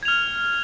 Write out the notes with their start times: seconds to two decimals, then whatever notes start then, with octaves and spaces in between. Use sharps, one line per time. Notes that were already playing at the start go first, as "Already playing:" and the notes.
0.03 G#6
0.05 F7
0.08 F6